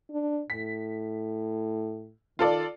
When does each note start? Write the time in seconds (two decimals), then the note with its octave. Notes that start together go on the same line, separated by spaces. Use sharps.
0.10 D4
0.50 A2 B6
2.39 D#3 F4 A4 D5